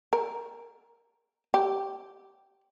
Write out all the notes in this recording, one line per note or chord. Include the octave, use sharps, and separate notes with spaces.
A#4
G4